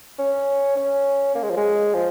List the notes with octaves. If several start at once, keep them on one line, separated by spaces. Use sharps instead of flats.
C#4
C#4
A#3
G#3
F3
G#3
F3